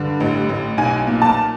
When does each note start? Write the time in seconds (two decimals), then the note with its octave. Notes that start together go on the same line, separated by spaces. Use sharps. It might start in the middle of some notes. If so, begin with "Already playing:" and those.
Already playing: G2 D3
0.20 A1
0.49 A1
0.78 B1 G#5
1.07 A#2
1.22 A5